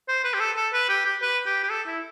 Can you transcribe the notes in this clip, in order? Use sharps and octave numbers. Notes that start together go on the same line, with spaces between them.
C5
B4
G4
A4
A4
B4
G4
G4
B4
G4
G4
A4
E4